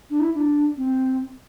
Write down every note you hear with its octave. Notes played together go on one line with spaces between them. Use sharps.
D4
E4
D4
C4